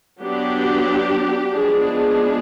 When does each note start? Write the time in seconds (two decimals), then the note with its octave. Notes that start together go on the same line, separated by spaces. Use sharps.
0.21 F#3 B3 D4 G4
1.53 F3 G#3 B3 D4 G#4
1.85 G#4